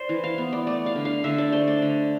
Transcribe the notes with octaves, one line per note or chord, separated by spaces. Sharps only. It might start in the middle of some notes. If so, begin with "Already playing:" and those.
Already playing: C5 D5
E3
F5
B3
D5
A3 D5
F5
D3
F5
D3 E5
D5
A3 C5
D5
D3